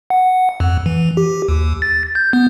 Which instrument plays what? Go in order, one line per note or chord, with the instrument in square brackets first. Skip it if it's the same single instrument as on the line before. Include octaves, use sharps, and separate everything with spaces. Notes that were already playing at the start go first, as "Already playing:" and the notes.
[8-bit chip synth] F#5
F2
E3
G4
D#2
A6
G6
B3